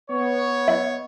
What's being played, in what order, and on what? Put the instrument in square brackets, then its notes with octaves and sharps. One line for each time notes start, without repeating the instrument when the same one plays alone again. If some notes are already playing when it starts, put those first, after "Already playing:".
[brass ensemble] B3 C#5
[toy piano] D#5